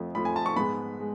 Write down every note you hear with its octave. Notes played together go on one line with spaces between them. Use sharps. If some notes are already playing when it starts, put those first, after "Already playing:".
Already playing: F2 F3 A3
F2 F3 A3 B5
G#5
A5
C#6
G#2 G#3 B3 B5
G#3